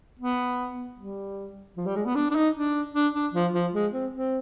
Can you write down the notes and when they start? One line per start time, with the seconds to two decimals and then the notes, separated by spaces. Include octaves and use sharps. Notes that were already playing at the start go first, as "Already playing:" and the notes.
0.19 B3
0.97 G3
1.77 F3
1.86 G3
1.96 G#3
2.05 B3
2.15 D4
2.31 D4
2.35 D#4
2.54 D4
2.94 D4
3.14 D4
3.33 F3
3.53 F3
3.73 G#3
3.93 C4
4.13 C4